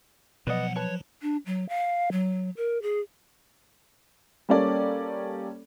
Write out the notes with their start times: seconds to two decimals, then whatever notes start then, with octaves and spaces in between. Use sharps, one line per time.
0.47 C2 B2 F3 F#3 B4 D5 D#5 F#5
0.76 B4 C#5 A5
1.22 D4
1.46 F#3
1.69 F5
2.12 F#3
2.57 A#4
2.82 G#4
4.49 G3 A#3 C#4 A4 D5